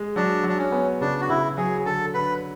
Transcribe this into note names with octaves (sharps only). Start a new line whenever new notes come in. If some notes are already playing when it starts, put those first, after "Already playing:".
Already playing: G#3
F#3 D4
F#3
D4
C#4
B3
C#3 D4
F#4
C#3 E4
F#3 G#4
D3 A4
D3 B4